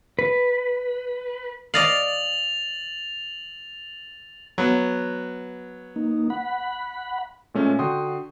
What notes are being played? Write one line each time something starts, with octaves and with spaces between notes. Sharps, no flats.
B4
D5 D#5 F5 A6 F7 F#7
F#3 B3
A#3 D#4
F#5 B5
A#2 G#3 A3 C#4
D3 F#4 G5 C6 D#6